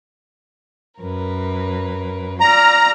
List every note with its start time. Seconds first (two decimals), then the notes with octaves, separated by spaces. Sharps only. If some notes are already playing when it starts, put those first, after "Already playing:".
1.00 F#2 A#4 B4
2.40 F4 D5 A#5 F6